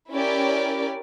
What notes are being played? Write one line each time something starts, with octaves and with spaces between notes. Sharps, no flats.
C#4 E4 G4 A#4 D5